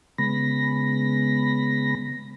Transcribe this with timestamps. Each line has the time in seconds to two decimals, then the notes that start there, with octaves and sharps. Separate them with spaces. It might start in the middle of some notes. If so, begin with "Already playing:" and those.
0.18 C#3 G#3 B3 B5 A#6